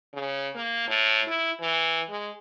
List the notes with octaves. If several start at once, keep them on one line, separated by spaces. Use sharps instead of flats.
C#3
A#3
A2
E4
E3
G#3